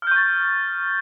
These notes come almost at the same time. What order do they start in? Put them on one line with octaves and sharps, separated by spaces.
F6 G6 C#6 A6